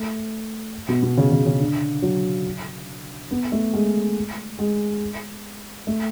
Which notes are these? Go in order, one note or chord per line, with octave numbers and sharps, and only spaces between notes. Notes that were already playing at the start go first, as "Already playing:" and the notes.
Already playing: A3
B2
B2
C#3
C#3
C#3
D3
F#3
B3
A3
G#3
G#3
A3